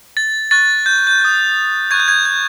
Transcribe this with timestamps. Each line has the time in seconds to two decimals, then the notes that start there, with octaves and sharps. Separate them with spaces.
0.17 A6
0.51 C#6 F#6 A6
0.86 G6
1.07 G6
1.21 D#6 F#6
1.91 C#6 F#6 G#6
2.00 G6
2.08 G#6
2.25 G#6